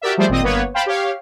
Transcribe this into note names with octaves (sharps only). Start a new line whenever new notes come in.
F#4 G4 A#4 D5 E5
F3 G3 A3 G#4 C5 D5
G#1 A#2 C4 D#5 D#6
G1 A#3 B3 B4 C#5
C5 F5 G5 A5 B5
G4 C#5 F5